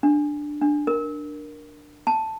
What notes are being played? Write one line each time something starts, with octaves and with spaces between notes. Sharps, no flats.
D4
D4
A#4
A5